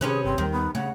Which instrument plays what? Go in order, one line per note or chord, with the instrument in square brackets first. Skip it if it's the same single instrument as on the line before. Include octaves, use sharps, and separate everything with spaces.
[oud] C3 C#4 B4 [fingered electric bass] D#3 [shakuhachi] G#4
[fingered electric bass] G1 [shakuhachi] C4
[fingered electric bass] D#2 G3 [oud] D#3
[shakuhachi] B3
[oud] C#3 [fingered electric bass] A3 [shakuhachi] F#5